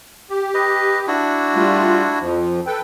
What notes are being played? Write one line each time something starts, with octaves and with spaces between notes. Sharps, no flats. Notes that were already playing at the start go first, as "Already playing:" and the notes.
G4
B4 D#5
D4 E4 F#4
G3 A3 F4
F2 F3
A4 B4 G5